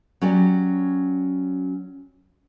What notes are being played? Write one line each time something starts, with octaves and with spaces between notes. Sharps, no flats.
F#3 C#4 F#4 G4 D5